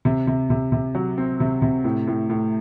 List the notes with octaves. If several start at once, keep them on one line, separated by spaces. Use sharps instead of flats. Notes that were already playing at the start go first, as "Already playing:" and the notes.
C3
C3
C3
C3
F#3
C4
C3
C3
A2
A2
A2